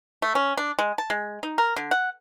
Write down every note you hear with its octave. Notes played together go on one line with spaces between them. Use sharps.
A3
C#4
D4
G#3
A5
G#3
D#4
A#4
D3
F#5